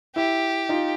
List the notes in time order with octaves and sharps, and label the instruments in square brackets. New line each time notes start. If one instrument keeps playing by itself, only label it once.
[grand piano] E4 [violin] G4
[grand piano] D#4 F4